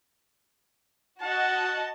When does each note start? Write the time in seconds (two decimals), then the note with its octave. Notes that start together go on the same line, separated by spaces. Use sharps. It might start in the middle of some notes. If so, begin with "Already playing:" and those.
1.22 F#4 D#5 F#5 A5